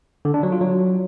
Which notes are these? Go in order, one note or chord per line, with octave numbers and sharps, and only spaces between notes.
D3
D4
F#3
F4
F#3